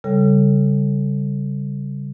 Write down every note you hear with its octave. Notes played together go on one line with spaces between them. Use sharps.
C#3 G3 A4